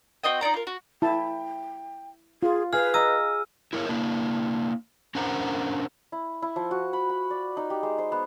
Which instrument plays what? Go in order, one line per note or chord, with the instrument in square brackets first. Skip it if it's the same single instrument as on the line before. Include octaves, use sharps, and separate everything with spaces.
[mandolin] C4 F#4 D#5 G5
D#4 F4 D5 A#5
F4 A#4
F#4
[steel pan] E4 A5 [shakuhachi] G5
[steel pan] F4 [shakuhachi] G#4
[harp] G#4 F5 [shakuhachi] B4 [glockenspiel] F6
[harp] D#5 A#5 [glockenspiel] E6 D#7
[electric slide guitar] E4 A#4 C5 C#5
A#3 D4 E4
C#4 D4 A#4 C5 F#5 A#5
[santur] E4
E4
F3
F#4
B5
B5
D5
D#4
G4
G#3
C5
B3